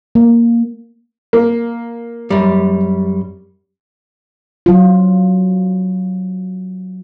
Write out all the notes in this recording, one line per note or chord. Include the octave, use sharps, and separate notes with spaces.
A#3
A#3
F#2 G3
F#3 F4